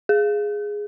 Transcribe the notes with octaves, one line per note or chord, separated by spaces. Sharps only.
G#4